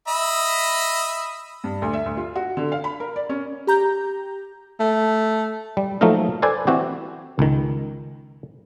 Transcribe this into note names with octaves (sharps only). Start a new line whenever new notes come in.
D#5 E5 B5
G2
D2
E5
D2
F4
F#4
D3
F5
B5
A#4
D5
C#4
G4 A#5 G6
A3
G3
F3 F#3 A3 A#3 D#4 A#4
A4 B4 C5 D5 G#5
E3 C4 F#4 G4
C#2 D#3